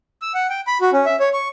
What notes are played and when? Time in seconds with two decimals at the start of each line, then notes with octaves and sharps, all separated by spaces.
0.22 E6
0.34 F#5
0.50 G5
0.67 B5
0.81 F#4
0.93 C#4
1.06 E5
1.19 C#5
1.33 C#6